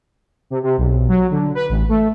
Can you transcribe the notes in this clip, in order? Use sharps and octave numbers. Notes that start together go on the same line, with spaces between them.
C3
C3
B1
F#3
D3
B4
A1
A3